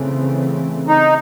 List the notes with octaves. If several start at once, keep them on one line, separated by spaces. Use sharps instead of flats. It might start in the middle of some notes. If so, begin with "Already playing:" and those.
Already playing: C#3 E3 A3 C4
D#4